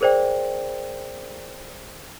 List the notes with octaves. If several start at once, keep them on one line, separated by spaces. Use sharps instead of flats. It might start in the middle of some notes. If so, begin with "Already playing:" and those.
G#4 A#4 C5 D5 G5